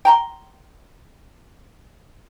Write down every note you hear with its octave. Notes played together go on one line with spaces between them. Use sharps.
G5 A#5 C6